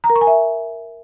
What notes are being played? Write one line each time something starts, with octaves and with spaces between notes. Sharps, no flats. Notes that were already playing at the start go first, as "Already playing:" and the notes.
A#5
A#4
C#6
G#5
E5